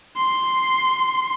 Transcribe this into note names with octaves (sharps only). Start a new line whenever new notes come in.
C6